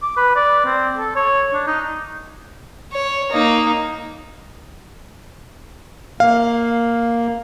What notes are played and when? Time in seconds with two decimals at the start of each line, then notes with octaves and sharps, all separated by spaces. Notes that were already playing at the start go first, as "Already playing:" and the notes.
0.02 D6
0.17 B4
0.36 D5
0.65 C4
0.98 A4
1.16 C#5
1.53 D4
1.67 D#4
2.92 C#5
3.32 A#3 D#4
6.20 A#3 F5